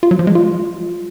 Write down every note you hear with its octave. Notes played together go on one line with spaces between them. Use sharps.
F4
F#3
F3
G#3
F4